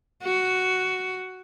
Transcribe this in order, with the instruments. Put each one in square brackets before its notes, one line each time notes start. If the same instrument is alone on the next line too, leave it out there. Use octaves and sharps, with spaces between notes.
[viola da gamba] F#4